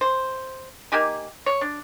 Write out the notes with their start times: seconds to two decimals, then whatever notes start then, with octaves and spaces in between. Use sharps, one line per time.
0.01 C5
0.92 A#3 D#4 G4 G#5
1.46 C#5
1.61 D4